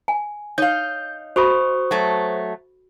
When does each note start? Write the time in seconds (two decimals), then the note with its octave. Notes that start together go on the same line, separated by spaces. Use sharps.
0.08 G#5
0.58 D#4 C#5 F5 G6
1.36 F#4 A4 C5 B5 C#6 D#6
1.91 F#3 A3